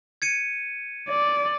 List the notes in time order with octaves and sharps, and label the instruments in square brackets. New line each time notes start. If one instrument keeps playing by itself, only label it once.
[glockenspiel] G#6 C#7 D#7
[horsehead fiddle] D5